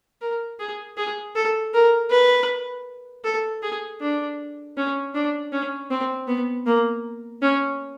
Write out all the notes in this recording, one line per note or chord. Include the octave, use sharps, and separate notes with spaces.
A#4
G#4
G#4
A4
A#4
B4
A4
G#4
D4
C#4
D4
C#4
C4
B3
A#3
C#4